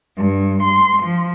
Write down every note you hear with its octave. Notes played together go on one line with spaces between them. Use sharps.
G2
C6
F3